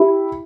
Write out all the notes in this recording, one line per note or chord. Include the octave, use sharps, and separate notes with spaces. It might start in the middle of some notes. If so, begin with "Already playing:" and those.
Already playing: E4 G4